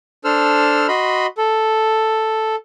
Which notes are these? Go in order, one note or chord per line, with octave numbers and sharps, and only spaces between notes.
D4 A4 C5 E6 F6
F#4 D#5 B5 C6
A4